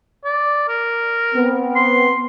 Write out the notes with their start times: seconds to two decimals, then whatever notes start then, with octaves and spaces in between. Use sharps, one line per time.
0.24 D5
0.68 A#4
1.33 B3 C4
1.75 C6